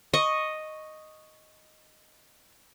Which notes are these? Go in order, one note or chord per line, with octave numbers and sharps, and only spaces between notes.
D#5 C#6